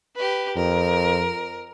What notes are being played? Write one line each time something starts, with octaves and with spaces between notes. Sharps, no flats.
G4 B4
F2 A#4